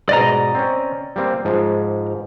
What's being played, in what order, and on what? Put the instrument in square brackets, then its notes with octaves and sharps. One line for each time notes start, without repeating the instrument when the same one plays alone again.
[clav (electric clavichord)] G#2 B2 [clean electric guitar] D5 D#5 A#5
[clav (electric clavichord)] C4 C#4
G3 A#3 C4
G#2 F3